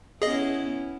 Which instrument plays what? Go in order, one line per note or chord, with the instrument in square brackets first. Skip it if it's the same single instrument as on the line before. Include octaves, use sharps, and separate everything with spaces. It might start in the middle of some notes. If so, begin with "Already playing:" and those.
[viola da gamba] B3 C#4 E4 [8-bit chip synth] G#4 D#5